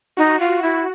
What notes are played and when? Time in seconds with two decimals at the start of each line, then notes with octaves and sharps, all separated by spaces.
0.17 D#4 F#4
0.40 F4
0.48 F#4
0.62 E4